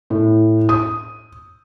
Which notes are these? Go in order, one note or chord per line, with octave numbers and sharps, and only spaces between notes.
A2
D#6